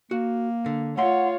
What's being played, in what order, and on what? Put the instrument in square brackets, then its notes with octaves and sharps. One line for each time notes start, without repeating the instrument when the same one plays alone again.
[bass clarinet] A#3 [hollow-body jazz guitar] F#4
[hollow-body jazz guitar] D3
[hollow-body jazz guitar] A3 F5 C6 [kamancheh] F4 C#5 [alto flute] F#5